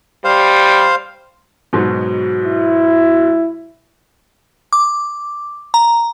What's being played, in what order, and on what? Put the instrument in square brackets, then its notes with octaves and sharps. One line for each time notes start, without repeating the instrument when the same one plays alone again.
[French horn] G3 [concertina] C5 F5
[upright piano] G#2 B2 F#3
[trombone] E4
[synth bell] D6
A#5